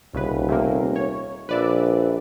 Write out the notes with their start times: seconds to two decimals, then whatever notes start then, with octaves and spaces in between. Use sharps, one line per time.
0.14 D#1 C2 C#3 B4
0.49 C3 A3 A#3
0.96 C#5
1.49 A#1 B4 D5 E5